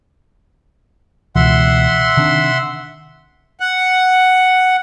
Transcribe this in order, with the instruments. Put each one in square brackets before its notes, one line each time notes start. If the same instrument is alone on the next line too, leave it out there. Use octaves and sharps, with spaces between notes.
[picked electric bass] C#2 B2 E3 [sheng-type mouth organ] E5 F#5 C6
[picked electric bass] C3 D#3 D4
[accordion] F#5